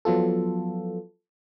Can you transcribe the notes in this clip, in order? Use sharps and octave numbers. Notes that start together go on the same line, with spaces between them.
F3 F#3 B3 F4 A4